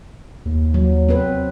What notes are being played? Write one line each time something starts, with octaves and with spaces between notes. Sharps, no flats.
D#2
F#3
C4 B4